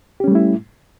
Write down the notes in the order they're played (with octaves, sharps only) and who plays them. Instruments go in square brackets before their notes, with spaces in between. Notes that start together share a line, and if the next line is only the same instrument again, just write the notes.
[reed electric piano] G4
C#4
G3
A3
E4